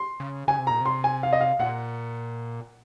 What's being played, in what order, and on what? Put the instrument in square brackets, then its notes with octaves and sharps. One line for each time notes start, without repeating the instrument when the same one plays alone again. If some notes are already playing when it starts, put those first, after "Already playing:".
Already playing: [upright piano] C6
[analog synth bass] C#3
[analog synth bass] C#3 [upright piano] G#5
[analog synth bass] C3
[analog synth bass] A#2 [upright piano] A#5
[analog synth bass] C3 [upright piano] C6
[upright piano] G#5
F5
D#5
F5
[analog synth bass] A#2 [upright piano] F#5